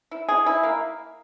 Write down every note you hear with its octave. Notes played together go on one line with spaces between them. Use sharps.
E4
G#4
E4
A#3